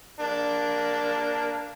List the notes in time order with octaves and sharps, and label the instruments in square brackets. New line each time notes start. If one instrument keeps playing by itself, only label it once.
[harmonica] A#3 D4